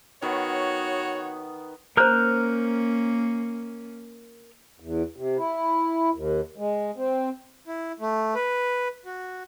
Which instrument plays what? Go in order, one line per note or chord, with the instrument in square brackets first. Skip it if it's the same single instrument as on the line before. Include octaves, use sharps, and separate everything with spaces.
[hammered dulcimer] D#3 B3 [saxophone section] F#4 C#5
[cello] A#3 C#4 [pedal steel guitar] A#4 F6 G6 [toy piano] C5 A#5
[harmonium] E2
C3
E4
D#2
G#3
C4
[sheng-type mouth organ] E4
A3
B4
F#4